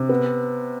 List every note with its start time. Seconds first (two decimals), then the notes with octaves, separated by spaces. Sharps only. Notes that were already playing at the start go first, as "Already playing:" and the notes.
Already playing: C3
0.09 B3